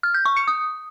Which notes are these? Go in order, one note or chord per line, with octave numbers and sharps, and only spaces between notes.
F6
G6
C#6
C#7
D#6